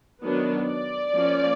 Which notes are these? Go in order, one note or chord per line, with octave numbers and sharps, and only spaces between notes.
D#3 F#3 B3 D4
D5
F3 A#3 C#4